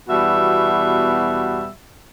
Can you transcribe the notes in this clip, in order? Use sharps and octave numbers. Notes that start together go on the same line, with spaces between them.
E2 B2 G3 F#4 E5